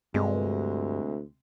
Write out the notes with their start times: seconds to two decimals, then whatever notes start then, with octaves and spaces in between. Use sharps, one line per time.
0.14 D2 G2 C3 G#3